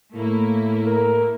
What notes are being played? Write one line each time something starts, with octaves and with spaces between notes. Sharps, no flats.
A2 A3 A#3 E4
A#4